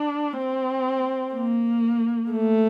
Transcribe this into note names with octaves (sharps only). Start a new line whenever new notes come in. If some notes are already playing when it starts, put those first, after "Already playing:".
Already playing: D4
C4
A#3
A3